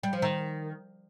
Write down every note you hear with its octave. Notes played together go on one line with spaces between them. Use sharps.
G3
F3
D#3